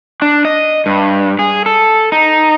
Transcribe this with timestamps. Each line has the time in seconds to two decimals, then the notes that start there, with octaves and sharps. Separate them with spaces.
0.22 D4
0.45 D#5
0.86 G2
1.39 G#4
1.66 A4
2.12 D#4